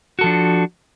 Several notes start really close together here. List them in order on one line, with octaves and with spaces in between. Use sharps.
F#4 A4 F3 D4